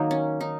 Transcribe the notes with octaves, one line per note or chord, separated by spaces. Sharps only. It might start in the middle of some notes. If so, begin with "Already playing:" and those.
Already playing: D#3 F#3 A#3 D#4
C#4
D#4